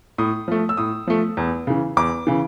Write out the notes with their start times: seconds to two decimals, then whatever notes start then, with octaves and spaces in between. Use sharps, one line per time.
0.18 A2 D#6
0.48 F3 A3
0.69 E6
0.77 A2 D#6
1.07 F3 A3
1.37 E2
1.67 C#3 E3
1.97 E2 D6
2.27 C#3 E3